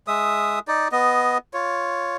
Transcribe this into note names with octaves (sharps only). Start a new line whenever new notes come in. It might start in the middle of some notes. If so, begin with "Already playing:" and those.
G#3 E5 D#6
D#4 D5
B3 D#5
F4 C#5